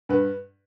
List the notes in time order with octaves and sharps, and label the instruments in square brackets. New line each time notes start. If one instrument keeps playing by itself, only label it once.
[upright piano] G2 B4